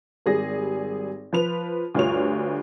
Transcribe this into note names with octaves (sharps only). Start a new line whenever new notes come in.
G#1 G3 G#4 A#6
F3 B4 F7
D2 G2 F4 C#5 F7